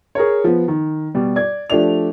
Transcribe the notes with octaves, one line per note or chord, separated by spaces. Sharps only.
G#4 A#4 C#5
F3 B3
D#3
B2 G3
D5 G#6
F3 A3 D4 G4 D5 F7